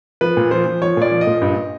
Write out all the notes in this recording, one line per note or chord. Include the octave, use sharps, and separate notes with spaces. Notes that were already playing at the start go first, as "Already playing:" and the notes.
F3 B4
A#2
F3 C5
F3
F3 C#5
A#2 D5
F3
D#5
A#2
G2